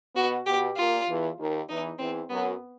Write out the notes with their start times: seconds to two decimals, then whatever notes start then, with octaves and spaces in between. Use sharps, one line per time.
0.15 B2 B3 F#4
0.46 B2 B3 G4
0.76 A#2 A#3 F4
1.07 E2 E3
1.38 D#2 D#3
1.69 E2 E3 D#4
1.99 E2 E3 C4
2.30 F#2 F#3 B3